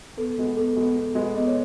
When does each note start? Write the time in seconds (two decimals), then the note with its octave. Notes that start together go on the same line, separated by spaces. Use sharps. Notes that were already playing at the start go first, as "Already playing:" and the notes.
0.17 E2 A4
0.37 B2 G#3 B3
0.57 E2 A4
0.76 B2 G#3 B3
0.96 E2
1.15 B2 G#3 B3
1.35 E2 D#5
1.47 C#5